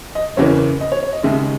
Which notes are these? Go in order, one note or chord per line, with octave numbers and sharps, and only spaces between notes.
D#5
F#1 E2 C#3 E3 A#3 C#5
D#5
C#5
C#5
D#5
D#2 C#3 G#3 D#4 E5